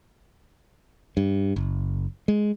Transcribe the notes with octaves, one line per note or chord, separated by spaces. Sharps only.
G2
F#1
G#3